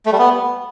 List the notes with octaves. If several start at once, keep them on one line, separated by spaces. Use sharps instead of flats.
A3
G3
B3